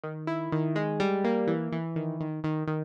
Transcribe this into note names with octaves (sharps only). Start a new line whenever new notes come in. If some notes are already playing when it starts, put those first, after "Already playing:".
D#3
E4
D#3
G#3
G3
A#3
E3
E3
D#3
D#3
D#3
D#3